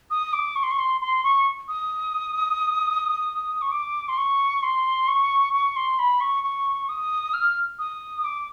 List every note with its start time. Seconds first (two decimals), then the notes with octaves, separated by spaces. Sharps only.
0.11 D#6
0.33 D6
0.56 C#6
0.63 C6
0.71 C#6
0.79 C6
1.01 C6
1.24 C#6
1.68 D#6
3.62 C#6
3.72 D6
4.08 C6
4.18 C#6
4.63 C6
5.08 C#6
5.53 C#6
5.76 C6
5.99 B5
6.21 C#6
6.44 C#6
6.89 D#6
7.34 F6
7.79 D#6
8.24 D6